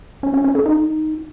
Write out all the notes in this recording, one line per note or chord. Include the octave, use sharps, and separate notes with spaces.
C#4
C#4
C#4
A4
D#4